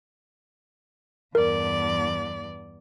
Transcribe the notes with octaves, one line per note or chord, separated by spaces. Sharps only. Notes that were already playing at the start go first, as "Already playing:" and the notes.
E2 G2 A#4 D5